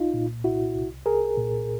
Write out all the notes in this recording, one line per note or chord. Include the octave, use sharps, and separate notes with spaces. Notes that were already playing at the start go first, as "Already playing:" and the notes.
Already playing: C2 D#4 F4
A#2
C2 E4 F#4
C2
C2 G#4 A#4
A#2